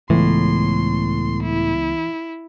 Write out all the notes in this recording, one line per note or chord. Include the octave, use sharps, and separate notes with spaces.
C#2 A2 E3 B3 C6
E4